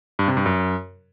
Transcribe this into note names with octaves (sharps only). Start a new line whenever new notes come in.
G2
C3
G2
F#2